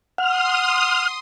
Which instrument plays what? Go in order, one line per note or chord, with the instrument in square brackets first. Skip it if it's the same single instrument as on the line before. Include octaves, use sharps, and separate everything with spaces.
[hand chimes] F#5 [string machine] C6 D#6 [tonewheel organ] F6